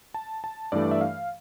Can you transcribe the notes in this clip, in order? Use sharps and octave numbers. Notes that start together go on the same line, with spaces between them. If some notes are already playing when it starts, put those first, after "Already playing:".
A5
A5
G2 E3 A3 D5
E5
F5